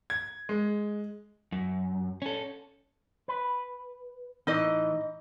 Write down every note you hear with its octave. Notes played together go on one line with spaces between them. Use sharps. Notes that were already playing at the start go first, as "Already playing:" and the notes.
G#6
G#3
F#2
C#4 A4
B4
A2 E3 D#4 D#5